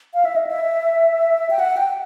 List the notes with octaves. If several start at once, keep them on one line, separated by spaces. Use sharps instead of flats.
F5
E5
D#5
E5
G5
F#5
G5